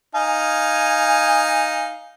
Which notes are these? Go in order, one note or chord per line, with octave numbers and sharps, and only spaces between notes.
D#4 F5 G#5